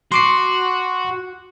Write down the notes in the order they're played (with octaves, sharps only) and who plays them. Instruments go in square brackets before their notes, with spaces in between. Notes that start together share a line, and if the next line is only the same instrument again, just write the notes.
[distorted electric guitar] F#4 [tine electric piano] C6 D6 C7